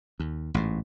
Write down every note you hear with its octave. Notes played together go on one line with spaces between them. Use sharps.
D#2
A1 G#2